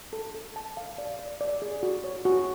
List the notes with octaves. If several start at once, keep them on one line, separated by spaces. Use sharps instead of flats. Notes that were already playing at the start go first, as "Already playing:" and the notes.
A4
A4
A5
F5
D5
D5
D5
G#4
F#4
C#5
F#4